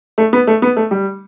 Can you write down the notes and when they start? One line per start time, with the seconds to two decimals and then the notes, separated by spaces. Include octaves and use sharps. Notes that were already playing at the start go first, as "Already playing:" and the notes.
0.18 A3
0.33 B3
0.47 A3
0.62 B3
0.76 A3
0.91 G3